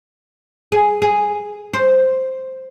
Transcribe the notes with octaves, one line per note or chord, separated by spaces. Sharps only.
G#4
G#4
C5